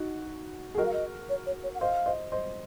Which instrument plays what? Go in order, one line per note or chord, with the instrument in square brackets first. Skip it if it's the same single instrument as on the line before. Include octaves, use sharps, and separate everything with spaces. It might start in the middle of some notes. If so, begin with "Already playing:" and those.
Already playing: [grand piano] D#4 F#4
G#4
[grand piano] F#4 A#4 [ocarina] D#5
[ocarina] F5
D#5
C#5
C#5
C#5
F#5
[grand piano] C5 D#5 [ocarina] F5
[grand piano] C5 D#5
C5 D#5